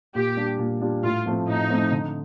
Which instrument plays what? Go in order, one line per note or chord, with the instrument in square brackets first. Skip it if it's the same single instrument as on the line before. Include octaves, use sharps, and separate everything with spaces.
[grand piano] A#2 [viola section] G4
[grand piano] G3 D4 F4
A#2
G3 D4 F4
[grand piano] A2 [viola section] F4
[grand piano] F3 A3 C4
[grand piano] A2 [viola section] D#4
[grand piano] F3 A3 C4
D3